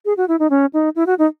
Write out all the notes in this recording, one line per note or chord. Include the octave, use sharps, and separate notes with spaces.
G#4
F#4
E4
D#4
C#4
D#4
E4
F#4
D#4